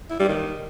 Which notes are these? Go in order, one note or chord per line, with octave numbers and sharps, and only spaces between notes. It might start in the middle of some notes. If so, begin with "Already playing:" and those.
E4
G3
D#3